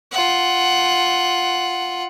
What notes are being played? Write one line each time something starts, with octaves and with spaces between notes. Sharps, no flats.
F4 F#5